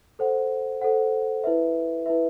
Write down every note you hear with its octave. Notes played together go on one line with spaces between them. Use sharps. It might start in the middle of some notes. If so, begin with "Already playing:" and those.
A4 C5 F#5
A4 C5 F#5
E4 B4 E5
E4 B4 E5